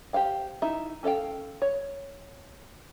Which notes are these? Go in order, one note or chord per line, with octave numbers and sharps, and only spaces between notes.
G4 C5 F5 G5
D#4 E4 E5
C#4 A4 D#5 F5 G5
C#5